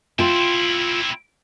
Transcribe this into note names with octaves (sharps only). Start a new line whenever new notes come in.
C4 E4 F4 G5